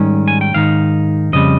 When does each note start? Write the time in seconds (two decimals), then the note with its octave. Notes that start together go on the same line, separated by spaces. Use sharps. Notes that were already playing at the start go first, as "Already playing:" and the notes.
Already playing: G#2 D#3 G3 C#4
0.28 G#5
0.41 G5
0.54 G#2 D#3 D#4 F5
1.33 F2 C#3 G3 D#5